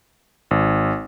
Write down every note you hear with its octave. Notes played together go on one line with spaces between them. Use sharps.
G#1